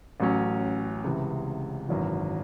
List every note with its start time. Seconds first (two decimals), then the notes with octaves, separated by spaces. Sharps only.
0.20 A1 A2 F#3 C#4
1.04 C#2 C3 E3
1.88 G#1 F#2 E3